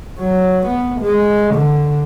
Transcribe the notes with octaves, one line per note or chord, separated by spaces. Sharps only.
F#3
B3
G#3
D3